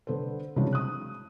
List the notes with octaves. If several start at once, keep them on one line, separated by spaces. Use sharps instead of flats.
D3 B3 A4 C5
C#3 E3 F#3 G#3 C4 D4
D#6 F#6